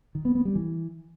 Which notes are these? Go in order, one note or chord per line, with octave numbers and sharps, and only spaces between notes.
D#3
B3
B3
G3
E3